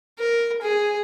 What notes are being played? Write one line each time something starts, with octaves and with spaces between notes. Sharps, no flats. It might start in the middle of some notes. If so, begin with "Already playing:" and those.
A#4
G#4